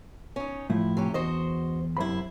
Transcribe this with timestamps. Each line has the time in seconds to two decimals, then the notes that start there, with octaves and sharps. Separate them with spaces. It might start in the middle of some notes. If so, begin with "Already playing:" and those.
0.36 C#4 D#4
0.70 A2 F3 E4
0.97 C3 C#4 G4
1.14 E2 F#4 C5 D#5
1.97 F#2 C3 E4 C5 B5